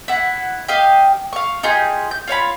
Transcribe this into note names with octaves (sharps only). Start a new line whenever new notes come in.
E4 F#5
G4 D#5 F5
F5 C#6
D#4 F4 G4 G#4
G6
F4 C#5 F5 B5